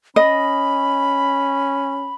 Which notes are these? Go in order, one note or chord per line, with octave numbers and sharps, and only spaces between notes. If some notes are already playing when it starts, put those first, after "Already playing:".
C#4 D#5 B5